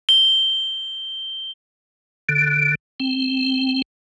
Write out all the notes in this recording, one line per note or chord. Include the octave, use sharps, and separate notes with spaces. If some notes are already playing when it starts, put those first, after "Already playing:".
G7
D3
C4